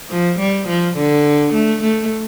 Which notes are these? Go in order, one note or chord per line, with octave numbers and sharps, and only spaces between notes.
F3
G3
F3
D3
A3
A3